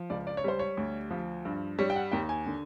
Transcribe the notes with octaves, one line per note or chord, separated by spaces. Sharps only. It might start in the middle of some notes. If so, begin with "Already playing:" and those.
Already playing: F3
C#2 D5
D5
C#5
G3 C5
C#5
D2
F3
G2
G3 C#5
G5
F#5
D#2 G5
G#5
D3